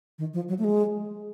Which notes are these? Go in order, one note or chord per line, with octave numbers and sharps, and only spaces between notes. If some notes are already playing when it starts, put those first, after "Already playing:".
D#3
F3
F#3
A3
G#3